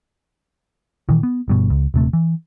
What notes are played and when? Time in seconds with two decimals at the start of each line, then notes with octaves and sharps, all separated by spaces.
1.09 A#2 D#3 E3
1.23 B3
1.48 G1 G2 B2
1.70 C#2
1.94 D#1 C3 A3
2.13 E3